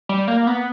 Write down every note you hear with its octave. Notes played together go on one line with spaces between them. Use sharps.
G3
A#3
B3